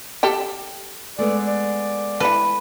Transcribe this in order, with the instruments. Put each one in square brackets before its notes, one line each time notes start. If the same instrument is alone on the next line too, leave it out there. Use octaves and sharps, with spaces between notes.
[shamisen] G4 A4 G5
[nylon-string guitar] G#3 A3 B3 [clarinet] D5
[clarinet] D5
[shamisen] E3 A4 [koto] B4